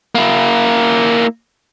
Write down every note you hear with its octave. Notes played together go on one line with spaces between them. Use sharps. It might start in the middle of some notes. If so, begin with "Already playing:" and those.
A#3 E4